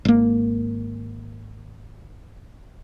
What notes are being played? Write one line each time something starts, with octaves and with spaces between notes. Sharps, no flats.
G#1 A#3